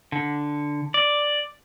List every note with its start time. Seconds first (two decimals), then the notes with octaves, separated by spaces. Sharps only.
0.12 D3
0.94 D5